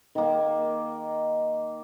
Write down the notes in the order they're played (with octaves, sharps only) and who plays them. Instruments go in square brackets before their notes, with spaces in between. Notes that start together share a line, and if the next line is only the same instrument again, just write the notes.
[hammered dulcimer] D#3 A#3